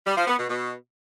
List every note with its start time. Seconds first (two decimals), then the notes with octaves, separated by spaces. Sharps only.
0.06 G3
0.16 F3
0.27 B3
0.38 B2
0.49 B2